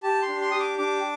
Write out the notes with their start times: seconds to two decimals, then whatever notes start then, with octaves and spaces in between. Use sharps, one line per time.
0.03 G4 A5
0.22 C6
0.28 D4
0.41 C6
0.51 G4 D#6
0.60 D6
0.78 D4 D6